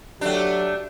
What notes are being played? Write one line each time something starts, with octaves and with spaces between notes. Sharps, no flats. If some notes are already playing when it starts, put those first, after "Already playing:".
F#3 A3 D4 G4